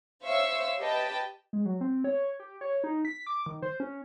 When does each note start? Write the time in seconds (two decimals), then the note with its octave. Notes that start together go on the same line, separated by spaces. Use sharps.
0.25 C5 C#5 E5 F5 C#6 E6
0.78 G4 B4 D#5 G5 A5
1.53 G#3
1.65 F#3
1.81 C4
2.04 C#5
2.40 G4
2.61 C#5
2.84 D#4
3.05 B6
3.27 D6
3.46 D#3
3.62 C5
3.80 C#4